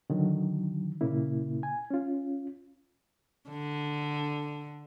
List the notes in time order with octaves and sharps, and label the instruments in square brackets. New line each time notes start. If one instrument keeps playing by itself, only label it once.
[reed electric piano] D3 D#3 F#3
A#2 C#3 A#3 E4
G#5
C#4 F4
[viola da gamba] D3